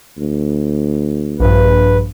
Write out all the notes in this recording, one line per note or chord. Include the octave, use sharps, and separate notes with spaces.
D2
A#1 G2 B4